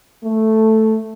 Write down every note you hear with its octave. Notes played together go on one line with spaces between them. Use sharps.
A3